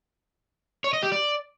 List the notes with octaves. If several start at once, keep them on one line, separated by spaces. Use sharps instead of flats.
C#5
D#5
G4
D5